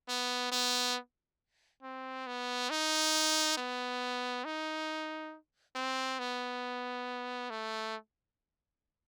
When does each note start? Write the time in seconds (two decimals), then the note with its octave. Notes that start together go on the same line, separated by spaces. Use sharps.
0.08 B3
0.52 B3
1.83 C4
2.27 B3
2.70 D#4
3.57 B3
4.45 D#4
5.75 C4
6.19 B3
7.50 A3